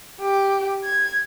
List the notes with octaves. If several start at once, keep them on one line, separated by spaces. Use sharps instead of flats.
G4
G#6